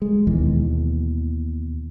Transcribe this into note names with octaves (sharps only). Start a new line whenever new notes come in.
G#3
D#2 B2 E3